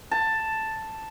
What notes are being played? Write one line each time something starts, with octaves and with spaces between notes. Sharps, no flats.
A5